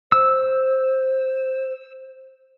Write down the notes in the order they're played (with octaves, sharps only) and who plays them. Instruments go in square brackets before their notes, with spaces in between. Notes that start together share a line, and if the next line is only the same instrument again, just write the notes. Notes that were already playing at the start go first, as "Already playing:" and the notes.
[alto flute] C5 [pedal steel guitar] E6